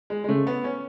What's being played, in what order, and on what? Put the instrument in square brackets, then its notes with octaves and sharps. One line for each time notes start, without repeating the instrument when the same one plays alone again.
[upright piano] G#3
G#3
[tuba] C#3 [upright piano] A3
[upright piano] B3
C#4